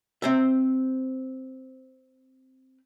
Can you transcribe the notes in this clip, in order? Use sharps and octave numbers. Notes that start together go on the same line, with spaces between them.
C4 C5 E5